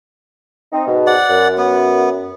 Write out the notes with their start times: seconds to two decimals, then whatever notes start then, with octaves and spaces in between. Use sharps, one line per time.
0.72 C4 D#4
0.86 G#2 B2
1.07 D5 F#5
1.29 F#2
1.58 B3